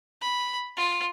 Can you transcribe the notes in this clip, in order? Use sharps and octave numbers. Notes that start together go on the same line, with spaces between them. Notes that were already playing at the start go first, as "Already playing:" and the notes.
B5
F4